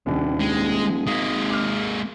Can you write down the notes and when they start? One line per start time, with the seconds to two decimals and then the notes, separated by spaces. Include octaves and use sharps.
0.06 D#1 D#2 C3 D4
0.41 G#3
1.07 G#1 G#3 A#3 D#6 B6
1.50 D6 F6